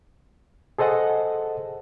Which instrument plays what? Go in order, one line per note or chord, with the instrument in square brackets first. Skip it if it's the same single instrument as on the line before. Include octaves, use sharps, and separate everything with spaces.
[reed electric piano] G#4 A4 C5 D#5 F#5 A5